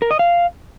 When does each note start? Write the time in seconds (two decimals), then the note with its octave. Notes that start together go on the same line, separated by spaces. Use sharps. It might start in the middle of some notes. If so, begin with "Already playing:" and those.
0.02 A#4
0.11 D#5
0.19 F5